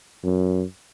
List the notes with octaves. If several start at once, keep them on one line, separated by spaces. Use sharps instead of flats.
F#2